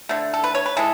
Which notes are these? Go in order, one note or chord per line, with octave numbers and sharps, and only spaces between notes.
D3 A3
A4
B4
C#5
B4
E3 G#3 A4